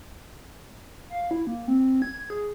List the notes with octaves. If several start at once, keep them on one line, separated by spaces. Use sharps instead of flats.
F5
E4
A#3
C4
G#6
G#4